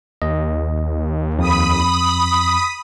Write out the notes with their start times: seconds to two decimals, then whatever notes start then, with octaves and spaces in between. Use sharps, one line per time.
0.22 D#2 D#5
1.39 F2 B5 D#6